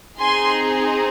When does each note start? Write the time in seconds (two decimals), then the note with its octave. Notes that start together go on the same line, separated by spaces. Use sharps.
0.19 C4 D#4 G#4 G#5 C6